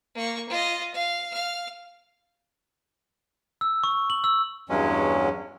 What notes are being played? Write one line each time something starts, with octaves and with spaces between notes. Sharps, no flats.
A#3 C#6
F4 D#5
F5
F5 F6
E6
C#6
F#7
E6
E2 G2 F#3 G#3 C#4